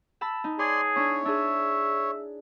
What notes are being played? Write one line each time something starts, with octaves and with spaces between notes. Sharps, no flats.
A5 B5 E6
D#4
G#4 C#5 D5 C6
D4 E4 C#5
D4 G#4 E5